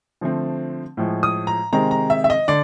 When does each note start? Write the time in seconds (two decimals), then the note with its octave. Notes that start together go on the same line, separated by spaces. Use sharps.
0.21 D3 F3 A3 C4
0.97 A2 F3 G#3
1.23 D#6
1.47 A#5
1.73 C3 D#3 G#3 C4 A#5
1.91 A#5
2.10 E5
2.24 E5
2.30 D#5
2.48 D3 D5